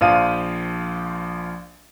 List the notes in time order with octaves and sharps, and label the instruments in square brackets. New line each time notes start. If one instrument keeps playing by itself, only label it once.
[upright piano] A#1 F3 F4 F5 D#7